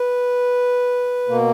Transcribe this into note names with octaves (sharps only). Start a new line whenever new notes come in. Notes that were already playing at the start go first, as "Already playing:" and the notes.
Already playing: B4
B2 A#3